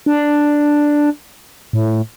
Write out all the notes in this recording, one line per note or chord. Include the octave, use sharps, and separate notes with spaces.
D4
A2